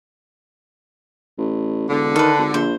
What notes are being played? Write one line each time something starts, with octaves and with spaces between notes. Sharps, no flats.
A1
E1 D3
D#3 A4 B4
G#1
A#1 C5